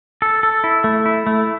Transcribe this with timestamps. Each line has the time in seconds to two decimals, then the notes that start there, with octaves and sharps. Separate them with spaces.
0.22 A4
0.43 A4
0.64 E4
0.84 A3
1.06 E4
1.27 A3